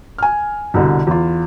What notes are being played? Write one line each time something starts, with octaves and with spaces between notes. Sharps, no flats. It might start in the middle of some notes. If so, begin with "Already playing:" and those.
G#5 F6
C2 B2 D3
E2 F4